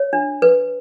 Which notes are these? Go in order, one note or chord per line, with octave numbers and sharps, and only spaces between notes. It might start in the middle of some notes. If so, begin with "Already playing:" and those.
Already playing: C#5
D4
B4